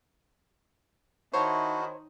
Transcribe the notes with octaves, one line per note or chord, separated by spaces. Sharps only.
D#3 E4 F#4 C5 C#5 E5 A5 C#6